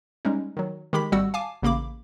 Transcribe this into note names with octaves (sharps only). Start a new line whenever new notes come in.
G3 G#3 C#4 D#4
D#3 F#3
D#3 G#3 G4 B5 B6
G#1 G3 F#4 F#5 E6
F5 G#5 A5 D6
A1 C#3 A#3 B5 D6